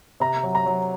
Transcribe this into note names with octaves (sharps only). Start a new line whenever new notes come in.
C3 A#5
F#3
A#5
F#3